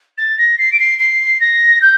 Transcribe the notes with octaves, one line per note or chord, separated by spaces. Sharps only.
A6
A#6
C7
D7
C7
C7
A#6
G6